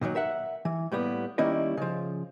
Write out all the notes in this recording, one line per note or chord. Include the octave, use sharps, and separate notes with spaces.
A#2 D#3 F3 F#3
A#4 E5 F#5
E3
A2 G3 A#3 B3
D#3 G3 A#3 C#4 E4 D#5
C#3 F3